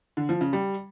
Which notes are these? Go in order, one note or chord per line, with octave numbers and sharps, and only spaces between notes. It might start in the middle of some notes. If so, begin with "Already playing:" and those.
D3
F3
C#3
G3